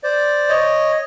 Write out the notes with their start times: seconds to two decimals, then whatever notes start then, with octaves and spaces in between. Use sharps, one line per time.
0.03 C5 D5
0.49 C#5 D#5